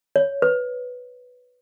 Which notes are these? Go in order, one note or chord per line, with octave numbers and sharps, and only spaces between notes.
C#5
B4